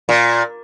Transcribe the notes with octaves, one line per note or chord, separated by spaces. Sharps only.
A#2